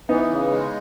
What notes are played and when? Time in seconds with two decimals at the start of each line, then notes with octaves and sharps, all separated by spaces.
0.09 E3 B3 D#4
0.30 C#3
0.52 G#3